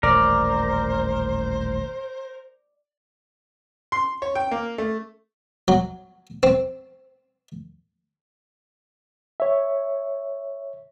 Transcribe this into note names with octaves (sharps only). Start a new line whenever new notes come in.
D#1 A1 A#4 C5 D5
C6
C#5
G5
A#3
A3
F#3
C4
C#5 E5